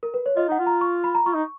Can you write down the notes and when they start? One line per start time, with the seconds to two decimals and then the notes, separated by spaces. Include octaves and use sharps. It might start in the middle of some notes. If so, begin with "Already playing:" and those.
0.03 A#4
0.14 B4
0.26 C#5
0.36 F4 D#5
0.48 D#4 F#5
0.59 F4
0.66 A#5
0.81 C#6
1.04 B5
1.15 A#5
1.26 F4 C#6
1.34 D#4